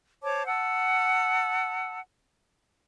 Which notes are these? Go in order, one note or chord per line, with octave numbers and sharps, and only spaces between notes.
C5 C#5 A5 D6
F#5 A5 E6